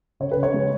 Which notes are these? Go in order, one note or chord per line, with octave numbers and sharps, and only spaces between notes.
C#3 C#5
B4
C#3
C#5
G#3